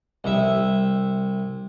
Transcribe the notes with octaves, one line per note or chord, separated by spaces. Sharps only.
C2 E5